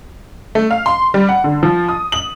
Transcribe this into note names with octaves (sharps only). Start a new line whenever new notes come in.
A3
F5
C6
G3
F#5
D3
F3
D#6
F#7